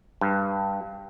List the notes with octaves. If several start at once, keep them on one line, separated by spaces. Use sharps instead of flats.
G2